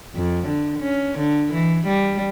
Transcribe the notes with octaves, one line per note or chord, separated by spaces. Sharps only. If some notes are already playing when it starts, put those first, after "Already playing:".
F2
D3
C#4
D3
E3
G3